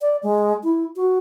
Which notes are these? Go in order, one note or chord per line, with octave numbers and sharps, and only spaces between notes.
D5
G#3
E4
F#4